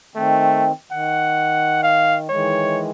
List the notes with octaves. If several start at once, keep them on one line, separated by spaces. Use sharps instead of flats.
D#3 A3 C4
D#3 F#5
F5
D#3 E3 G#3 C#5